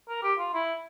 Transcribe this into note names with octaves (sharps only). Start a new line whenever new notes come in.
A#4
G4
F4
E4